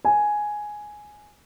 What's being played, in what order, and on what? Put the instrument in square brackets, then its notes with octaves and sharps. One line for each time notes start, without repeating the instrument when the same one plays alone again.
[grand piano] G#5